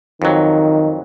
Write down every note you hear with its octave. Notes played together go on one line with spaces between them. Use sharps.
F2 D#3 F#3